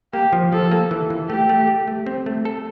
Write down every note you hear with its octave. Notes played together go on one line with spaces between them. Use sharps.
A#3 G4
F3
F3 A4
A#3
E3
E3
A3 G4
A3
G4
A3
C4
A3
A4